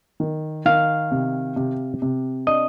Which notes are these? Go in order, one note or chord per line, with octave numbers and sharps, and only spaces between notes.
D#3
D#3 F5
C3
C3
C3
D4 D#5